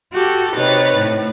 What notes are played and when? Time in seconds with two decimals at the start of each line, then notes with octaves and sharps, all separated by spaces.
0.13 F#4 G4 A4
0.55 C3 C4 D#4 B4 C#5 A6
0.96 A2